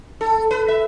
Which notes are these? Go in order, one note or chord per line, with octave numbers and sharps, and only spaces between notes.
A4
B4
E5